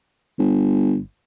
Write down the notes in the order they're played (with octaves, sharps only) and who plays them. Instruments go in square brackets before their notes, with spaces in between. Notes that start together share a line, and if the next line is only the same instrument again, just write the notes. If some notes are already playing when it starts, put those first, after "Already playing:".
[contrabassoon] G1